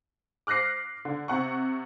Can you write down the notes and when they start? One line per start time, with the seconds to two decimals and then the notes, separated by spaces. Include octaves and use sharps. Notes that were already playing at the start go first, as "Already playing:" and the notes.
0.47 D6 F6 F#6 A#6 C7
1.05 D3
1.28 C3 F#5 C#6